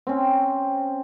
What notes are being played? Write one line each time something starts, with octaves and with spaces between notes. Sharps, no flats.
C4 C#4